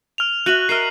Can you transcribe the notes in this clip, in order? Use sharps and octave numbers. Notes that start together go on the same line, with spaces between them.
F6 F7
F#4 E5 F#6 D#7 F#7
A#4 D#5 E5 F6 C7